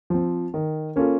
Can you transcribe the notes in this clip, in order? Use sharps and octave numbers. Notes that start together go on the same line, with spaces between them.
F3 C4
D#3
A#3 C#4 F4 A4